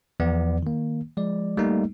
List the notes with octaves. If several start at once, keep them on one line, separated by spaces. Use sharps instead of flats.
E2 F3 B3 D5
D#3 A#3
F3 G#3 D5
G3 A3 A#3 D#4